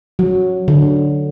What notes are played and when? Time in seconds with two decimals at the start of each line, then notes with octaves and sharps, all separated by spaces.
0.19 F#3
0.68 D3